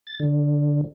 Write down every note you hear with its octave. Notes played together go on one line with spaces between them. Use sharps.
A6
D3